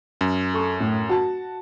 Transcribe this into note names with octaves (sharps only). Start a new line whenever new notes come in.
F#2
A4 C#6
A2
F#4 A5